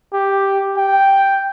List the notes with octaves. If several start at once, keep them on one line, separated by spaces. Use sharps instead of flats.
G4
G5